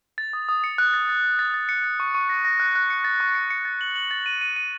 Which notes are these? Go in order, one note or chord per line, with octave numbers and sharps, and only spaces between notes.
A6
D#6
D#6
C#7
F#6
A6
A6
A6
A6
A6
C#7
A6
C#6
C#6
A#6
A#6
F#6
F#6
C#7
A6
C#6
C#7
C#7
A6
F#7
F#7
A6
D#7
D#7
D#7